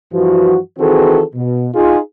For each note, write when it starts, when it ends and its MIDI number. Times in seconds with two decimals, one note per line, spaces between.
0.13 0.57 43
0.13 0.57 52
0.13 0.57 53
0.13 0.57 66
0.79 1.22 51
0.79 1.22 52
0.79 1.22 60
0.79 1.22 66
0.79 1.22 68
0.79 1.22 69
1.34 1.68 47
1.74 1.98 63
1.74 1.98 65
1.74 1.98 68